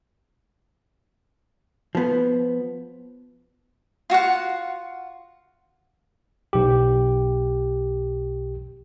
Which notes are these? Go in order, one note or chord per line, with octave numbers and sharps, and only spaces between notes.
F3 B3
F4 F#4 F5 F#5
B1 G4